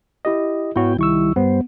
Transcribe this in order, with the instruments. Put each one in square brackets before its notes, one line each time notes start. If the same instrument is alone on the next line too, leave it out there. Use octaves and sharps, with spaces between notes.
[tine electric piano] E4 G4 D#5
[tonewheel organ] G#2 B3 G5 [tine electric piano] E4 F#4 C#5
[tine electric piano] C2 C#6 E6 [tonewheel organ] D#3 G3 E4
[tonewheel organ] G2 G3 C5 [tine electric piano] B3